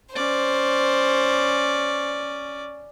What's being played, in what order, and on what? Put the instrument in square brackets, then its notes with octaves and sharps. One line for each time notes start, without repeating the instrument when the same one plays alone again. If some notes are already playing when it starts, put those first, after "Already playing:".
[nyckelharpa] C#4 D5 [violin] C5